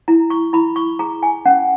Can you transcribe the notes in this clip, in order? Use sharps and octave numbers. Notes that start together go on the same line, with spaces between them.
E4 A#5
C#6
E4 B5
C#6
G#4 A#5
G#5
C#4 F#5